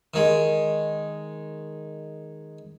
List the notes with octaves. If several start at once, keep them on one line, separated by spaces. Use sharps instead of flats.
D#3 G#3